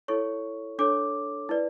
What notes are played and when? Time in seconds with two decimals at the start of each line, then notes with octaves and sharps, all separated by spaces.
0.08 E4 A4 C#5 C#6
0.79 D4 A4 C#5 D6
1.49 E4 B4 D5